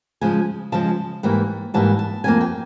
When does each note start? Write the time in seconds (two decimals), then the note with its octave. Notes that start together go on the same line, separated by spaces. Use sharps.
0.21 C#3 F3 G#3 G#5
0.72 C#3 F3 G#3 A5
1.23 G#2 E3 G3 A#3
1.74 G#2 E3 G3 A#3 A5
1.99 A5
2.24 F2 C#3 F3 A#3 G#5
2.41 G5